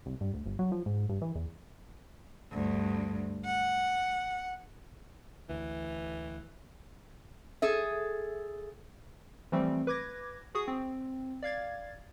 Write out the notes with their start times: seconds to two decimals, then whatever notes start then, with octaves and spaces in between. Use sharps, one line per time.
0.06 C2
0.21 G2
0.34 D2
0.46 G1
0.59 F#3
0.72 F3
0.86 G#2
1.09 G2
1.21 E3
1.35 E2
2.52 D2 G2
3.46 F#5
5.49 D2 E3
7.62 G#4 A4 E5
9.52 E3 F3 G3 A3 C4
9.87 B4 D6 G#6 A#6
10.55 F#4 G#4 C#6 D#6
10.68 C4
11.43 D5 F5 G#6 A6